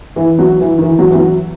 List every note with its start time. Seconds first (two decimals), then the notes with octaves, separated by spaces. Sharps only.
0.16 E3
0.39 F#3
0.60 E3
0.78 D#3
0.82 E3
0.99 F#3
1.11 E3
1.15 F#3